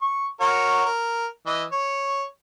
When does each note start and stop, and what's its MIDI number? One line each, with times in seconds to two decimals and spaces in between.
0.01 0.26 85
0.40 0.84 66
0.40 0.84 70
0.40 0.84 73
0.85 1.26 70
1.46 1.64 52
1.46 1.64 75
1.72 2.23 73